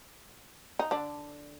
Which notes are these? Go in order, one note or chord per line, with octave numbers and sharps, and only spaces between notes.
D#4
D3 D4